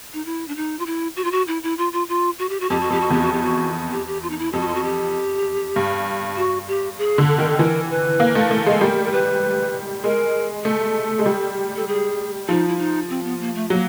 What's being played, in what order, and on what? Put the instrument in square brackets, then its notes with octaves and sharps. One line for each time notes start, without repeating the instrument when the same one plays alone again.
[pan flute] D#4
E4
D4
D#4
F4
E4
F#4
F4
F#4
E4
E4
F4
F4
F4
F#4
G4
F#4
[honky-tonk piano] F2 [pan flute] G4
[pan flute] F#4
[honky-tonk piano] F2 [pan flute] G4
[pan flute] F#4
[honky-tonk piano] E2 [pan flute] G4
[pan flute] F#4
G4
F#4
G4
G4
F4
D#4
E4
[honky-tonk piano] F2 [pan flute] G4
[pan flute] F#4
F4
F#4
G4
[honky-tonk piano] G2
[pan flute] F#4
G4
G#4
[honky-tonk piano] D3
[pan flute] A4
[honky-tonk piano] D#3 [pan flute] A#4
[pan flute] A4
[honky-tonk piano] E3 [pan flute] A#4
[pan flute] B4
[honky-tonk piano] A#3
A3
A3
G#3
[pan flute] A4
[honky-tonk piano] G3 [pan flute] A#4
[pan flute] A#4
B4
[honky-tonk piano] G#3 [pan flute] A#4
[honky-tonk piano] A3 [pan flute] A4
[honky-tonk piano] G#3
G3
[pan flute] A4
G#4
[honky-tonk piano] F3 [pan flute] D#4
[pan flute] E4
D#4
C4
B3
A#3
A3
[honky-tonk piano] F#3 [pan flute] A#3